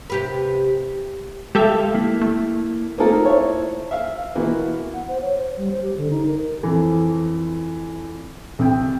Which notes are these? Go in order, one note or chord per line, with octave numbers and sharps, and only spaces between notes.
C3 G4 B4
G#3 G4 A4 E5 F5
A#3 E4
A3
A#3 C4 D#4 F4 A4 A#4
E4 C5 C#5
E5 F5
B2 E3 A#3
F#5
C5
C#5
C5
G3
C5
G4
D3
D#4
A#4
F2 E3
C2 G5